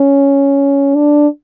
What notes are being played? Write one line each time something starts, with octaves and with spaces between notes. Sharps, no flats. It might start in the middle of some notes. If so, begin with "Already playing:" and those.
Already playing: C#4
D4